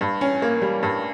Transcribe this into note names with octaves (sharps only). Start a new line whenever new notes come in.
G2
C#4
A#3
G3
G2